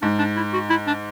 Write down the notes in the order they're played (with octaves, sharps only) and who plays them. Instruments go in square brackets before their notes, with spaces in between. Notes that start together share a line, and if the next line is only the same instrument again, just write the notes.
[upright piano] G#2 [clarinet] D4
[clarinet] D4
E4
F#4
E4
D4